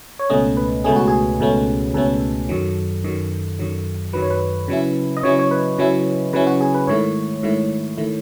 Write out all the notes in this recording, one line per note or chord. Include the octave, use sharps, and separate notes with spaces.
C#5
C#2 B2 A3 C#4 D#5
B4
C#2 B2 A3 C#4 G#4
F#4
G#4
C#2 B2 A3 C#4
C#2 B2 A3 C#4 A4
F#2 D#3 F#3
F#2 D#3 F#3
F#2 D#3 F#3
F#2 D#3 F#3 B4
C#5
B4
C#3 F#3 C#4 E4
D#5
C#3 F#3 C#4 E4 C#5
C#5
B4
C#3 F#3 C#4 E4
C#3 F#3 C#4 E4 B4
F#4
G#4
B4
G#2 D#3 A3 E4 C#5
G#2 D#3 A3 E4
D#3 A3 E4